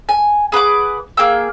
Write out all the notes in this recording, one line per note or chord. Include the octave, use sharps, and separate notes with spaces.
G#5
G#4 B4 F#5 D6
A#3 G#4 G5 E6